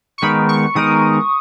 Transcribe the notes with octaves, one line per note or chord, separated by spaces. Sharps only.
C#6
D#3 G#3 B3 D#4 A#4 B5
C#6
D#3 G#3 B3 D#4 A#4 D#6